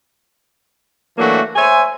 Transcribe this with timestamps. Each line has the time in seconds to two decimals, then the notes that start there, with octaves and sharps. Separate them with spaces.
1.17 E3 F#3 A3 A#3 D4 F#4
1.56 C5 C#5 E5 G#5